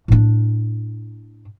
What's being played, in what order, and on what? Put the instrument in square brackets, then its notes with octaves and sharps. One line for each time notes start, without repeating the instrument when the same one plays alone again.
[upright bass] A2 D4